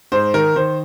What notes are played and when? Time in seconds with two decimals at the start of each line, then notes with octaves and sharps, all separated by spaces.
0.12 G#2 C5
0.34 D#3 A#4
0.56 D#3 C5